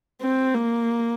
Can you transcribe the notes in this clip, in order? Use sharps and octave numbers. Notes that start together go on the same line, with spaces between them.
C4
A#3